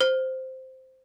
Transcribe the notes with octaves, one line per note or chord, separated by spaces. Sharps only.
C5